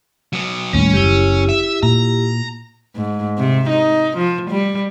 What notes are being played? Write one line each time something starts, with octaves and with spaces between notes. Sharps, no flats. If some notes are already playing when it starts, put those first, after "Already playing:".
F#3 B3
D#2 A2 G3 C#4
F#1 E4 G4
E5
A#2 A#5
G#2
C3
D#4
F3
G3